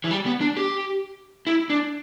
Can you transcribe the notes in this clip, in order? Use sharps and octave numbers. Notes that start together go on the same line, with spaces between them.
E3
G3
B3
D4
G4
E4
D4